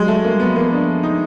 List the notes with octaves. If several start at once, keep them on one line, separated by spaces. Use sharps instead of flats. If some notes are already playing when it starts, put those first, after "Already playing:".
Already playing: F#3 G#3
A3
A#3
G3
B3
F#3
F3 A#3
D4
D#4